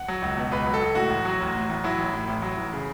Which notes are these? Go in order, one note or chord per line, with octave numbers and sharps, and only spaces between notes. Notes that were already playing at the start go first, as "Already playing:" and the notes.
Already playing: F#5
F#3
C#2
B2
C#2 B4
F#3
A4
C#2
A2 F#4
A1
F#3
A1
A2
A1
F#3 E4
A1
A2
A1
F#3
A1
C#3